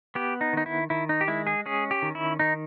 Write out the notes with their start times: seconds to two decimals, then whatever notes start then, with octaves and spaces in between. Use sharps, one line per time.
0.15 B3 G4
0.41 D#4
0.53 D#3 D#4
0.66 E4
0.90 D#3 E4
1.09 D#4
1.21 G4
1.28 G#3 E4
1.47 G#4
1.66 C#4 G#4
1.91 G4
2.02 D#3
2.15 E4
2.39 D#3 D#4